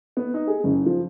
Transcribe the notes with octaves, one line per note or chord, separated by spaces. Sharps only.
B3
D#4
G#4
F#1
F3